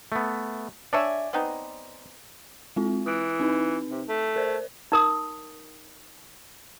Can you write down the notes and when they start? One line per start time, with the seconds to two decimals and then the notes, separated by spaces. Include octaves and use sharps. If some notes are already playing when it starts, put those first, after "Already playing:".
0.12 A3 B3
0.93 D4 C#5 D5 E5 G#5
1.33 B3 C4 D#4
2.76 G#3 C4 F4
3.06 E3 D#6 F#6 D7
3.40 C4 D#4 B4
3.90 C3
4.08 A3
4.36 A#4 C5 D5
4.92 D#4 A#4 D#6